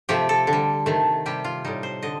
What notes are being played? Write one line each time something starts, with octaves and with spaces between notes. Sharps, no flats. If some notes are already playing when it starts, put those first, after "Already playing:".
C3 F3 A3 G4
A4
D3
G3
C3 D#3 A3
C3 G3 G4
F4
A2 G3 D#4
C5
D3 D#5